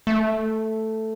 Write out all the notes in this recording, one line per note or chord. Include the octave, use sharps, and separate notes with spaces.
A3